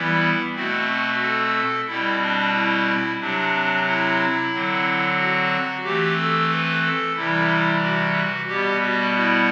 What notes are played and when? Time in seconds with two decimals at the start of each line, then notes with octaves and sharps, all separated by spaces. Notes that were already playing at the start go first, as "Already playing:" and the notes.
Already playing: E3 G3 B3 E4
0.55 B2 A3 C4 F#4
1.22 A4
1.87 B2 G3 C4 E4
2.21 D4
2.53 E4
3.19 C3 F#3 C4 D4
3.86 E4
4.52 D3 F#3 C4
5.18 F#4
5.84 E3 A3 C4 G4
6.17 A4
6.49 B4
6.83 A4
7.15 C3 E3 G3 E4
7.82 F#4
8.47 B2 G3 B3 G4
8.81 F#4
9.14 E4